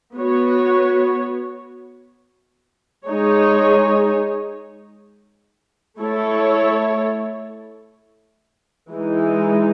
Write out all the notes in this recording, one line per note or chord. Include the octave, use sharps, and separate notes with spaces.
B3 F#4 C#5
G#3 D#4 G#4 C#5
A3 E4 A4 C#5
E3 G#3 D#4